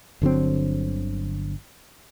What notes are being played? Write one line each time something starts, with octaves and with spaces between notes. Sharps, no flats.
G1 D3 F#3 C4